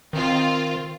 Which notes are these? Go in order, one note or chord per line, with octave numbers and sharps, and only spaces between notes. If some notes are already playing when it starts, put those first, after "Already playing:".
D#3 C4 F4